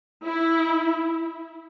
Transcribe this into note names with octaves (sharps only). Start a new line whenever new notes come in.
E4